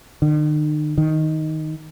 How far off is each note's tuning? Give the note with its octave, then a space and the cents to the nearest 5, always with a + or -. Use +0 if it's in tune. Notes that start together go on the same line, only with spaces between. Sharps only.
D#3 -45
D#3 +5